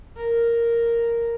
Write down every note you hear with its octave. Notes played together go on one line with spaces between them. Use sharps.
A#4